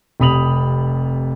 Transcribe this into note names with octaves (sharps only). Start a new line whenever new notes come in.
F1 C3 B5 D#6 F7 F#7